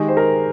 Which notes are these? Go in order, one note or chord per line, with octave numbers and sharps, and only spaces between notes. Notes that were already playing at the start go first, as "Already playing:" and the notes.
Already playing: D#3 G#3 D#4 G4 G#4
C5
A#4